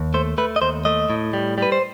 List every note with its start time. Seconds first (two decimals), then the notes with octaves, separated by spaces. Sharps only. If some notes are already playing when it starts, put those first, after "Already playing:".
Already playing: D#2
0.14 A3 C5
0.38 A3 B4
0.56 D#5
0.62 D#2 C5
0.85 A3 D#5
1.10 A2
1.33 G3
1.58 G3 B4
1.72 C5